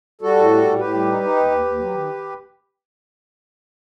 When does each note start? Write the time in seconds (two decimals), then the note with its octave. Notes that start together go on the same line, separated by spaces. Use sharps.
0.21 G3 F#4 A4
0.36 A2
0.50 G3
0.64 A2
0.79 A2 G4 B4
0.94 G3
1.09 D#4
1.23 D#4
1.36 D#2
1.51 D#2
1.65 D#2
1.79 F#3
1.94 D#3